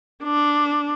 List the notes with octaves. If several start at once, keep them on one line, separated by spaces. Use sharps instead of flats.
D4